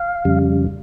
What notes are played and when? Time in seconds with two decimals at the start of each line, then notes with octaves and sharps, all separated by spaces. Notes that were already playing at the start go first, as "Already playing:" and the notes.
Already playing: F5
0.25 F2 C#3 G3